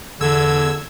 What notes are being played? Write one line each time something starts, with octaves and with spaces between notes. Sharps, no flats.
E2 D3 E6 G#6